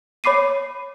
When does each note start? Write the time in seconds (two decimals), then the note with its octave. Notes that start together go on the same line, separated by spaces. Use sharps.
0.24 C#5 B5 D6 C7 D#7